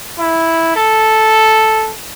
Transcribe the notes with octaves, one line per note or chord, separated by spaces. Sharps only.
E4
A4